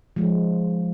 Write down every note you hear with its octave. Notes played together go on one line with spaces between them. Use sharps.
F3 G#3